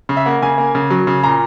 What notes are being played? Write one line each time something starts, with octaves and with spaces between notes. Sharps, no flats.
C#3
E5
A#3 F#5
C#3 G#5
A#3
C#3
F#3
C#3
A#2 A#5